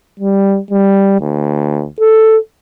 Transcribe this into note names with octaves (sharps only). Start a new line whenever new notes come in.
G3
G3
D2
A4